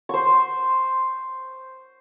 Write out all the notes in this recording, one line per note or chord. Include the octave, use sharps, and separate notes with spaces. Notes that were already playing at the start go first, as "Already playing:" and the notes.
C5 C#6